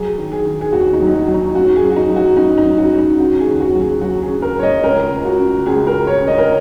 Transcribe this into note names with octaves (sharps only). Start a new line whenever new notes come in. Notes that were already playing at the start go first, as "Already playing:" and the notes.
Already playing: F#3 G#4
D#3
G#4
D#3
G#4
D#2 F#4
D#4
F#3
D#4
F#4
F#3
D#4
F#2 F#4
G#4
F#2
F#4
D#4
F#3
F#4
F#2 D#4
D#4
F#2
F#4
F#2
D#4
C#3 F#4
G#4
D#2
F#4
F#3
G#4
F#3 F#4
G#4
C#3
A#4
F#3 C#5
D#5
C#2 A#4
C#2
F#4
C#3
C#2 G#4
A#4
C#3
C#5
C#3
D#5
A#4